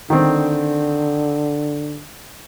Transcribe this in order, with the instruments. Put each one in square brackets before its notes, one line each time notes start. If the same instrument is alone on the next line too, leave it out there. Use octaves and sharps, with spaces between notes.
[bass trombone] D3 [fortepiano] D#3 C4